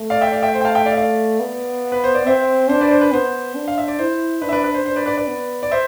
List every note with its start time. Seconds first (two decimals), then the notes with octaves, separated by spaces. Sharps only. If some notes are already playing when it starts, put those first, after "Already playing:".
Already playing: A3
0.10 D5 F5
0.21 E5 G5
0.32 D5 F5
0.42 E5 G5
0.54 C5
0.61 G5
0.65 F5 A5
0.75 E5 G5
0.86 D5 F5
0.92 E5
0.97 D5 F5
1.40 B3
1.92 B4
2.04 C5
2.15 D5
2.26 C4 C5 E5
2.69 D4 C5
2.81 B4 D5
2.91 C5
3.01 B4
3.12 B3 C5
3.55 D4
3.68 F5
3.78 E5
3.88 D5
3.99 E4 C5
4.42 D4 B4
4.49 E5
4.52 B4 D5
4.64 B4
4.74 C5
4.85 D4 C5
4.96 B4 D5
5.06 B4 D5
5.17 B4 D5
5.28 B3
5.63 D5
5.71 C5 E5